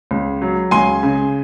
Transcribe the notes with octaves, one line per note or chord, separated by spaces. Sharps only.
C#2
F#3
C#2 G#5 C6
C#3